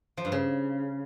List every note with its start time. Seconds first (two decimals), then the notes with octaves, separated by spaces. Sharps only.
0.17 F3
0.25 G2
0.32 C#3